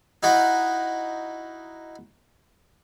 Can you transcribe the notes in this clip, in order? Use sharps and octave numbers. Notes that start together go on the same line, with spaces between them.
D#4 E4 F#4